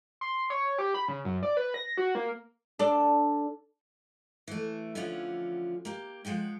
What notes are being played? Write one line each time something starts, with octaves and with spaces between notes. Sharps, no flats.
C6
C#5
G4
B5
C#3
F#2
D5
B4
A#6
F#4
A#3
D4 A4
E3 A3
D3 E3 F3 C#4 F4 F#5
A#3 G4
F3 G#3 F#5 G5